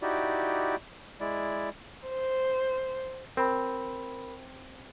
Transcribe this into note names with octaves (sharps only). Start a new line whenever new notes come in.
D#4 E4 F#4 G4 D5
G#3 E4 D5
C5
C4 A#4 B5